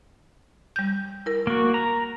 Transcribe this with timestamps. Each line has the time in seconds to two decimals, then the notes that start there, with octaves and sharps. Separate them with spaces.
0.76 G3 G6
1.26 E4 A#4
1.47 A#3 F#4
1.74 A#5